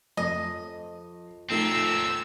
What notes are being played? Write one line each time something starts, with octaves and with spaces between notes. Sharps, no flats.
F2 D#5
A#2 F3 A3 C4 D#4 E6